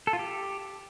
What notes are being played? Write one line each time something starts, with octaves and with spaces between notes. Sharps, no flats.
A4
F4
G4